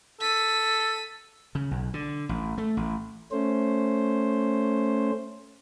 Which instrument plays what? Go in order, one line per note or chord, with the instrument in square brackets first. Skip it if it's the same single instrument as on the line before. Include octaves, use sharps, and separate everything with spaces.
[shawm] A4 [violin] B6 D#7
[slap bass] C#3
B1
D3
A1
A3
A1
[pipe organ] A3 C#4 C5